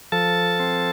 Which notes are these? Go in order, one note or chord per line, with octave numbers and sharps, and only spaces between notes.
F3 A4 A5
C4